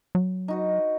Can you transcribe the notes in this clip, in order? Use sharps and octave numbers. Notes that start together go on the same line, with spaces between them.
F#3
D#4 F#4 B4